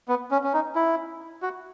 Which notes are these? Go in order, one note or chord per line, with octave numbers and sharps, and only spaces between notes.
B3
C#4
C#4
D#4
E4
F#4